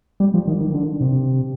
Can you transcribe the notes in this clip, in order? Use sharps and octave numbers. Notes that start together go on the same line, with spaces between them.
G3
F3
D#3
D#3
D3
C3